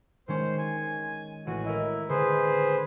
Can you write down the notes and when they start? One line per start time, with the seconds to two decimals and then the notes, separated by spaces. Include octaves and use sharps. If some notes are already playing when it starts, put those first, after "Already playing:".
0.28 D#3 G#3 C#4 C5
0.58 G#5
1.47 A1 F#4 D#7
1.65 E4 A#4 D#5
2.09 D3 G#4 B4 C5